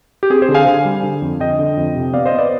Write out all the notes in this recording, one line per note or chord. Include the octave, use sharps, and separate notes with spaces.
G4
C4 G#4
G#4 C5
D3
F5 G#5
D3
G3
D3
F2
D3 D#5 G5
D3
F2
C3
B3 D5 F5
C5 D#5
B3
B4 D5